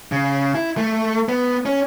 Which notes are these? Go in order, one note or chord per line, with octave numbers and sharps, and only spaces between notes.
C#3
E4
A3
B3
C#4